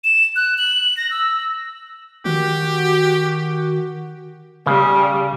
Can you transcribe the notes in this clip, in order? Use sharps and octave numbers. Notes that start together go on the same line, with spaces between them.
E7
F#6
F#7
A#6
E6
D#3 F#4 G4
C#3 G3